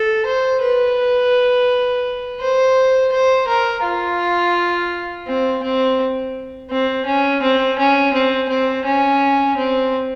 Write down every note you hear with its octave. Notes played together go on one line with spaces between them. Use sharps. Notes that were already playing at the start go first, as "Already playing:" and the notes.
Already playing: A4
C5
B4
C5
C5
A#4
F4
C4
C4
C4
C#4
C4
C#4
C4
C4
C#4
C4